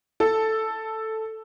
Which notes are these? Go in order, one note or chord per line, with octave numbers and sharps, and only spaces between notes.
A4